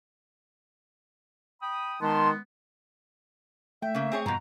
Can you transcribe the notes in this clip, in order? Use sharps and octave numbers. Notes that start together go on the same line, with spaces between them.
G5 B5 D#6
D#3 G#3 B3 A5 C6
A3 E5 G5
C#3 A#3
C4 G#4 C#5
G2 B2 F3 A#5